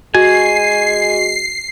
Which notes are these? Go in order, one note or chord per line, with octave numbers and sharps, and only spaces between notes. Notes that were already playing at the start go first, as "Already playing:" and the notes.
G#3 F#4 G#5 C7